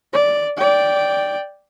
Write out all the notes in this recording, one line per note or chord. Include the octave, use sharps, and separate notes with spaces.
D5
D5 G5